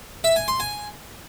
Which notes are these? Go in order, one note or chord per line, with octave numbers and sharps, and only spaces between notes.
E5
G#5
C6
G#5